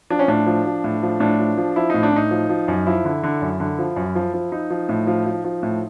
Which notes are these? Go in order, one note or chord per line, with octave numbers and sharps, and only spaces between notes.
F3 D4
C#4
A2 D4
F3
F3
A2
F3
A2 D4
F3
F3
F3 E4
A2 D#4
D4
A2 D#4
F3
F3
F#2
F3 E4
D3
D3
F#2
D3
F3
F#2
F3
F3
F3 D#4
F3
A2
F3
F3
F3
A2